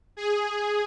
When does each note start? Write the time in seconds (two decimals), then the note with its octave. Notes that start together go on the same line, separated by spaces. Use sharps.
0.17 G#4